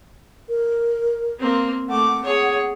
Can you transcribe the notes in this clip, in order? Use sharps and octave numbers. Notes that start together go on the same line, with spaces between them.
A#4
A#3 C4
A3 F#5 D6
G#4 C#5